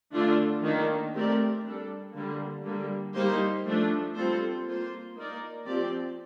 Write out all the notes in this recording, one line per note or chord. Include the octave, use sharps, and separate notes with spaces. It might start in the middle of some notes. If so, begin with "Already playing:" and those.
D3 A3 D4 F4
D#3 A#3 D4
A3 C4 G4 A#4 D5
G3 D4 A4
D3 G3 A#3
D3 G3 A#3
G3 A#3 D#4 G4 C5
F3 A3 D4
G3 C4 F4 A4 C5
A#3 F4 C5
A#3 D#4 A#4 D5
F3 C4 G4 D5